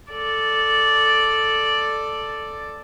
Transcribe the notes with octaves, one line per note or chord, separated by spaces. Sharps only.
A4 D5